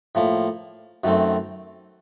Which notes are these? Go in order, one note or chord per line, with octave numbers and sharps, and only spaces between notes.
A2 F3 A#3
F#2 D#3 A3 C4